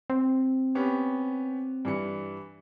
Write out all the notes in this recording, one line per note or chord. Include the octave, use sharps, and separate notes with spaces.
C4
B3 C#4 G4
G2 E3 C#7